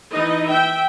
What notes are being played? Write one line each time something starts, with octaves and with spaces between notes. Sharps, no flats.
E3 D#4 D#5
E5 G5